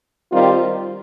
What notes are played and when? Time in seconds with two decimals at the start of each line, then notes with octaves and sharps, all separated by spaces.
0.31 D#3 G3 C4 F4